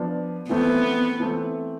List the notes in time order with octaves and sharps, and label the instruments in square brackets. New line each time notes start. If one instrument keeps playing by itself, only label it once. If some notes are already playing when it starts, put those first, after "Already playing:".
Already playing: [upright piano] F3 B3 D4
[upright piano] E3 A3 C4 [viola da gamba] B3
[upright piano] E3 A3 C4